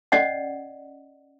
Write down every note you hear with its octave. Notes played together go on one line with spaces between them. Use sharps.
C#4 D5 D#5 F#5